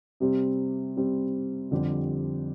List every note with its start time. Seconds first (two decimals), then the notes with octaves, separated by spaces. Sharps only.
0.20 C3 G3 C4
0.96 C3 G3 C4
1.71 F2 D3 G3 C4 G4